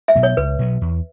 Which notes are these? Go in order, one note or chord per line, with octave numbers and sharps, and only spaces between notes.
E5
B2 F#3 B3
C#5
C#2 B4
B2 F#3 B3
E2